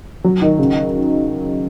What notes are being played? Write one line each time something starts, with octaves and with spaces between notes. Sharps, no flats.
F#3
D#3
C#3